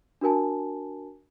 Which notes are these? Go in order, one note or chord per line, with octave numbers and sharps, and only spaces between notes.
D4 F#4 A#4 G#5 A5